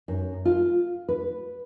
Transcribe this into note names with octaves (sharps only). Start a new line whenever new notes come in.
F#2
F4
B4